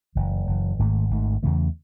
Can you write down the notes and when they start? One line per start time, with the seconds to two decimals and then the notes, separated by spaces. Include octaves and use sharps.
0.15 F#1 F#2 E3
0.47 F#1 F#2 E3
0.79 G#1 G#2 D#3 A3
1.10 G#1 G#2 D#3 A3
1.43 E2 C#3 E3 A3